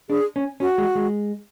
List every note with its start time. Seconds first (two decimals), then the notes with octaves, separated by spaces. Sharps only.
0.09 D4 G#4
0.36 C#4
0.60 C#4 F#4
0.78 G#3
0.95 G#3